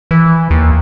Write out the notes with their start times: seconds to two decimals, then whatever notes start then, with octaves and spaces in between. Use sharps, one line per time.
0.11 E3
0.51 D#2